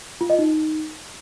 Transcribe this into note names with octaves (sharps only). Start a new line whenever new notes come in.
F4
D#5
D#4